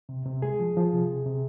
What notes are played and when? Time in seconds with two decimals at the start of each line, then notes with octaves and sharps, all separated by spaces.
0.09 C3
0.26 C3
0.42 G#3 G#4
0.60 F3
0.77 F3
0.93 C3
1.09 C3
1.26 C3